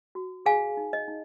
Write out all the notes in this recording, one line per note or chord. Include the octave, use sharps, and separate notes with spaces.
F#4
G#4 F5 G#5
D#4
D#5
D#4